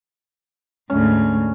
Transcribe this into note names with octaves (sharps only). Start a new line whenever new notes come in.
D2 G#2 C#4